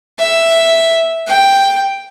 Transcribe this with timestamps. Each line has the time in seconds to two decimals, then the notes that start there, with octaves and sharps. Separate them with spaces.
0.19 E5
1.28 G5